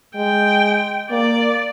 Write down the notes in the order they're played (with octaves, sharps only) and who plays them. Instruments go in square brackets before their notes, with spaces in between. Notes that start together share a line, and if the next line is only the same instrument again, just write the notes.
[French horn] G#3 [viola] G5
[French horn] A#3 [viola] D5